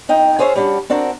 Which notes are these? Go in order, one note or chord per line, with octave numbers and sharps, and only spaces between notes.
F2 D#4 G5
F4 G#4 C5 C#5 D#5 E5
G3 C#4 D4 F#4
C4 D4 F#4 A#4